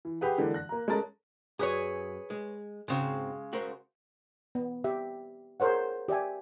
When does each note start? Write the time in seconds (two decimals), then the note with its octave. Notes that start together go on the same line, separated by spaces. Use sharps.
0.05 E3
0.21 G4 G#4 B4 F#5
0.38 D3 E3 G#3 A#3 D4
0.54 F#6 A#6
0.69 A#3 A#5
0.88 G#3 A3 C#4 A#4 A5 A6
1.59 F#2 G#4 B4 C#5
2.30 G#3
2.88 G#2 C#3 G#3 C4 F#4
3.53 F#4 A#4 C5
4.55 B3
4.84 G4 E5 G5
5.60 G#4 A#4 C5 C#5 F#5
6.08 G4 D5 E5 G#5